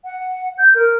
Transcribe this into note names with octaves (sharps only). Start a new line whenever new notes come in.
F#5
G6
A#4